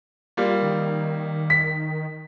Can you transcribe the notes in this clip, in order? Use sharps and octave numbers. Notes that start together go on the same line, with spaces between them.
G3 A#3 F4
D#3
B6